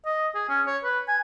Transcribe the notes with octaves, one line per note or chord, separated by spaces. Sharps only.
D#5
G#4
C#4
C#5
B4
G#5